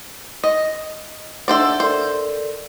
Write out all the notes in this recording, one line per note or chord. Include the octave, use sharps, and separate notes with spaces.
D#5
D4 A4 C5 D5 E5 F#5
A4 A#4 C5 D5